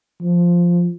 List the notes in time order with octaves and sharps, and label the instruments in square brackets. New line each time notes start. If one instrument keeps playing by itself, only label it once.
[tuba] F3